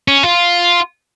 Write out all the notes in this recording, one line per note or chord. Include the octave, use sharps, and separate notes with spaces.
C#4
F4